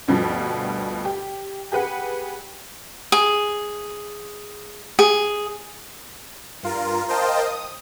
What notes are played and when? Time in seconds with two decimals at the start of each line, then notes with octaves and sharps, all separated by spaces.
0.08 D2 G2 B2 F3 G3
1.05 G4
1.72 G4 G#4 B4 F#5
3.12 G#4
4.99 G#4
6.63 G2 F4 A#4
7.08 A#4 C5 D#5 F5 G5 A5
7.43 D#6